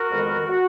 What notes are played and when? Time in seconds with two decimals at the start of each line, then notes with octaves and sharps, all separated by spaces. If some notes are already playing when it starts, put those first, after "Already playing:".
Already playing: F#4 A#4
0.10 F2 D#3 G#3 B3
0.48 F#4